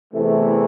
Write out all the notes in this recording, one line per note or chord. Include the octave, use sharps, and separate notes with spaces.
E2 C3 E3 A3